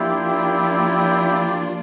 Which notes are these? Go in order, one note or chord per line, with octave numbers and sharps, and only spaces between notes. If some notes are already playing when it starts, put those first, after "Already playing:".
Already playing: F3 A#3 D4 E4 F4 G4